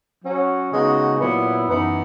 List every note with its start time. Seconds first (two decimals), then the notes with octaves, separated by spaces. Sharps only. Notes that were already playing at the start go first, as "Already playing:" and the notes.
0.24 F#3 C#4 F#4
0.72 C#3 G#3 B3 D#4 F#4
1.20 A#2 F#3 B3 E4
1.68 F#2 E3 B3 D#4